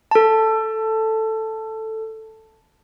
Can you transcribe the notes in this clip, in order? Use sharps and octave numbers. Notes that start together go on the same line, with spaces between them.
A4 A5